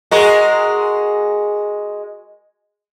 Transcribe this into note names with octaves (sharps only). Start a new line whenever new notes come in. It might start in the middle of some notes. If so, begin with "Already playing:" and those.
G#3 F#4 A#4